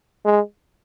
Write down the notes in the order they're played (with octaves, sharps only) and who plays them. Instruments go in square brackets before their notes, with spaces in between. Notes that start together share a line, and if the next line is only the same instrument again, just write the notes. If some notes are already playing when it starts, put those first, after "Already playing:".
[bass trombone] G#3